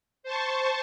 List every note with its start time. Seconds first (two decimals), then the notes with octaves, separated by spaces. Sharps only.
0.23 C5 A5 C#6